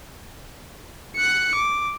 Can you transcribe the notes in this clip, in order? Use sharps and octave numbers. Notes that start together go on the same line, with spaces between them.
F#6 C#7
D6